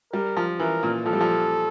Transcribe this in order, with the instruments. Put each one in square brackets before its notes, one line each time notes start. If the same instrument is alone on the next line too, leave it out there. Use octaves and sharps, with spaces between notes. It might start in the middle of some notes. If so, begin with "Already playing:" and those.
[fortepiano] G3 [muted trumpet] A#4
[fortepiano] F3
[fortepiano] E3 [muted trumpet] A#4
[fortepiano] A#2
[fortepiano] F3 [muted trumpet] A4
[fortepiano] G3
F3